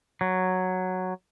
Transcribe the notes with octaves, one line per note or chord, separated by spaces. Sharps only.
F#3